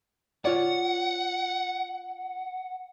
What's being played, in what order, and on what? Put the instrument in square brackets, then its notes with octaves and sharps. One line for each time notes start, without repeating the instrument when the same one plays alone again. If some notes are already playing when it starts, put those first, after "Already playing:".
[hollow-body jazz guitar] F4 C#5 D5 [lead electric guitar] F#5